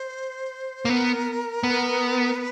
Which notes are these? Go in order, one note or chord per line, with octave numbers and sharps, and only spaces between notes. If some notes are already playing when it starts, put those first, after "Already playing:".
Already playing: C5
A#3
B3 A#4
B3
B4